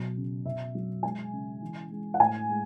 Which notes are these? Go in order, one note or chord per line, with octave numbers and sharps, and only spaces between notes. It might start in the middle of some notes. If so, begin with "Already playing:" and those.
Already playing: B2 F#3
C#3
B2 E5
F#3
G#3 G#5
C#3
E3
G#3
F#5
A2 G#5
G#3